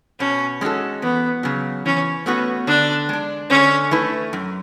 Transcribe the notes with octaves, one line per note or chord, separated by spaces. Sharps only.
B2 C#4
G#3 C#4 F#4 A4
E2 B3
C#3 F#3
E3 C#4
A3 B3 C#4 F#4 B4
D3 D4
G#3 D4
D3 C#4
A3 E4 B4
F#2